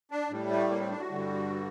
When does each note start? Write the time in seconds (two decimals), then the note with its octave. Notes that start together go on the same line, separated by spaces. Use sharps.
0.11 D4
0.30 A2 G3
0.50 A3
0.70 A#3
0.80 C4
0.91 D4
1.00 F#4
1.10 G2 D3 G3